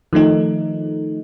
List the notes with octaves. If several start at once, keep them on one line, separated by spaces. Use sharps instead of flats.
D#3 F3 A3 D#4